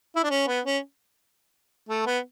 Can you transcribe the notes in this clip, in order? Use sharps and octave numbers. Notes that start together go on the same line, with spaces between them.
E4
D4
C#4
B3
C#4
A3
B3